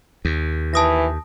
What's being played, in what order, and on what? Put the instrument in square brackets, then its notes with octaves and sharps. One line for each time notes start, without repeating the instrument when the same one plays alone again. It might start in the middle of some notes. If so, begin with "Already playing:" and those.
[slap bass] D#2
[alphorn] E3 [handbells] A5 D#6 A#6